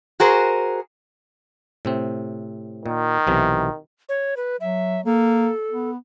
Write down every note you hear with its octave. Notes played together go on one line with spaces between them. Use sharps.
F#4 G#4 A#4 C5
A2 C3 C4
A#2 D#3
B1 C3 E3
C#5
B4
F#3 E5
A#3 A4
B3